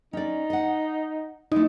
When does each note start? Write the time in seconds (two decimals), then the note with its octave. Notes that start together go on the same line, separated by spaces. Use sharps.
0.13 C#4 D#4 D5
0.50 D#5 F#5
1.52 A3 D#4 E4